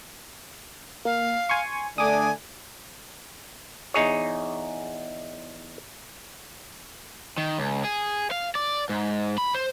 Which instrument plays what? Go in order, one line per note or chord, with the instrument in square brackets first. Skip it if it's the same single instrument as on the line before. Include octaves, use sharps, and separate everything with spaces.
[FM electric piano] A#3 [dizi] F5
[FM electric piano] G#5 C6 C#6
[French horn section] D3 A3 D4 [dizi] G#5 [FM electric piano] D6 D#6
[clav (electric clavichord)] E2 D#4 G#4 C#5
[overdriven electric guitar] D#3
C#2
G#4
F5
D5
G#2
B5
C5